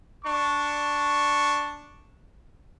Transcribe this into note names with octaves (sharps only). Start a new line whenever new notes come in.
D4 C#6